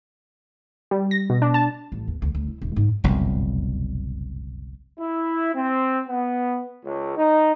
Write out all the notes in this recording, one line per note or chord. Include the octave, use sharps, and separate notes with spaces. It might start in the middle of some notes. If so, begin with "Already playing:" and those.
G3
A#6
B2
D4
A5
A1
E2
D2
D2
E4
D#1
G#2
F#1 C2 F2 B2
E4
C4
B3
C#2
D#4